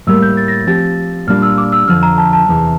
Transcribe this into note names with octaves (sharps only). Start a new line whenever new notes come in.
A2 G3 A#3 E6
G6
A6
A#6
A6
F3 C4 G4 A6
A#2 G3 D4 F4 F6
E6
D6
E6
F2 D3 F3 F6
A#5
A5
A5
E2 C3 E3